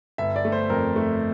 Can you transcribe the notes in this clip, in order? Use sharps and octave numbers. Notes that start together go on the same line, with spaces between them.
G1 E5
D5
A3
C5
F2 A#4
A3